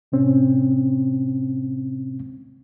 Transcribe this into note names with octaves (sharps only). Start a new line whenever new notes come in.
A2 C3 C4 C#4